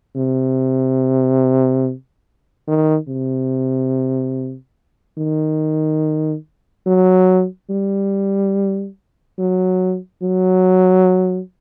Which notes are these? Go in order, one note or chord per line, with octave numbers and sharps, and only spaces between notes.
C3
D#3
C3
D#3
F#3
G3
F#3
F#3